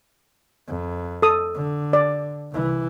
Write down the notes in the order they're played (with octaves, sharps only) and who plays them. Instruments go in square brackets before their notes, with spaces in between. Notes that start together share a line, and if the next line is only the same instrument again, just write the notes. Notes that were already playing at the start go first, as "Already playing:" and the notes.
[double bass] F2
[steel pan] A4 D#6
[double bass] D3
[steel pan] D5
[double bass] C2 E3